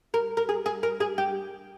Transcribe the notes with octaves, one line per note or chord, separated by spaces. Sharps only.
A#4
A#4
G#4
G#4
A#4
G#4
G4